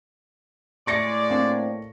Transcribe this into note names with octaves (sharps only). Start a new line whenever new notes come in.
A2 G#3 D5 C#6 A#6 C#7
A#3 C4 D4